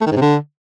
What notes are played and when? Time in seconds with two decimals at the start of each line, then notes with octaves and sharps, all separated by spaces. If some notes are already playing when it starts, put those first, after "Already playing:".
0.01 A3
0.06 D#3
0.11 G#2
0.16 C3
0.22 D3